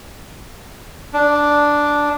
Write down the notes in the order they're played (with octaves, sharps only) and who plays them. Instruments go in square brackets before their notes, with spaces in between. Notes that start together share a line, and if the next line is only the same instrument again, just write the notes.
[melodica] D4